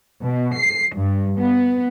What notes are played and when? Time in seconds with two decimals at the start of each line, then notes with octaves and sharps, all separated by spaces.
0.22 B2
0.55 C7
0.95 G2
1.38 B3